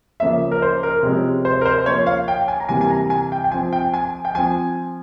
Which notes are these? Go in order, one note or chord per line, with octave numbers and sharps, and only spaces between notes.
C#3 F3 A#3 C#4 E5
A#4
C5
A#4
C3 F3 G#3 C#4
C5
A#4
C5
C5
F3 A#3 C#4 C#5
F5
G5
G#5
A#5
C3 E3 G3 A#3 G#5
G#5
A#5
G#5
G5
G5
F3 C4 G#5
G5
G#5
G5
F3 C4 G#5